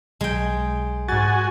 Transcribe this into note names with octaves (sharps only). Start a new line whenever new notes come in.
B1 G#3 G5
G#2 F#4 G#5 A6